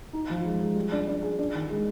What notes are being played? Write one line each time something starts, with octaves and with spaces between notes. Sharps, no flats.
D#4
F3
G#3
G#3
G3
D4
D4
G#4
D4
D#3
G#3